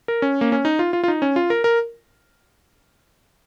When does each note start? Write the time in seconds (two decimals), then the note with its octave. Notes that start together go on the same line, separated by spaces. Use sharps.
0.08 A#4
0.22 C#4
0.41 A#3
0.52 C#4
0.65 D#4
0.79 F4
0.93 F4
1.04 F4
1.08 D#4
1.22 C#4
1.36 F4
1.50 A#4
1.64 A#4